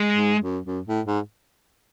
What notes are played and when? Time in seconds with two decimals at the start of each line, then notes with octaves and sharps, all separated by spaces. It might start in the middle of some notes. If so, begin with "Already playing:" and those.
Already playing: G#3
0.15 G#2
0.41 F#2
0.66 F#2
0.87 A2
1.06 G#2